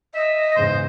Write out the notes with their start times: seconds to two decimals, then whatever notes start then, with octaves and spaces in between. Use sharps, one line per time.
0.15 D#5 E5
0.56 E2 G#2 C#3 C5